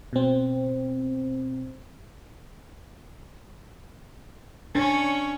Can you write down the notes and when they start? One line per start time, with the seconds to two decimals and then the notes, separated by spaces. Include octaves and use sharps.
0.13 B2 C4
4.75 C#4 D4 C#5